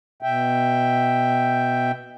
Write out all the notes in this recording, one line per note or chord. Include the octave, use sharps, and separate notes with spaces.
B2 E5 G5